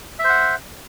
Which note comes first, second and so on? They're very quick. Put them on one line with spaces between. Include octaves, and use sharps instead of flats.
E5 C5 F#5